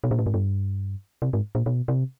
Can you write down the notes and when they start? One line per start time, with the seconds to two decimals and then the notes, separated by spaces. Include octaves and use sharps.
0.04 B2
0.11 A#2
0.19 A2
0.26 G#2
0.34 G2
1.22 C3
1.33 G#2
1.55 A#2
1.66 B2
1.88 C3